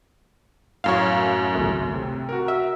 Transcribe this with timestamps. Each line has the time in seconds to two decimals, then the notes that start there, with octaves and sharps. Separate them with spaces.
0.84 F#2 A2 C#5 F5
1.55 G#1 C#2 A3
1.94 C3
2.29 F#4 A#4
2.48 E5